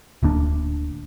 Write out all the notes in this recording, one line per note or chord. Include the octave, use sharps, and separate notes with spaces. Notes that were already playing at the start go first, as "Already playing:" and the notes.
D1 D2 A#3 D4